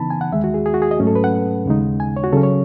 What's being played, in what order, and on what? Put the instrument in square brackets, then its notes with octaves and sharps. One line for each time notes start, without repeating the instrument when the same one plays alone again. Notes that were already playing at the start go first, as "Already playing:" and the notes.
Already playing: [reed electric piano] C#3 E3 B3 D#4 A5 B5
G#5
F#5
D#2 D#3 G#3 E5
F#4
G#4
G#4
F#4
G#4
D#5
G#2 F#3 A3 C#4
A4
B4
F#5
D#2 C#3 G#3 D#4
G#5
C#5
F#4
C#3 F#3 C#4 A4
C#5